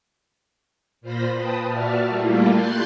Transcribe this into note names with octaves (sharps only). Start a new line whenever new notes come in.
A#2 F4 C5 B5 A#6
B4 G5 A5 B5 D#6
A#2 F#4 D5 E5 A5 F6
G3 A3 A#3 E4 F4
C6 F#6 G6 A6 C7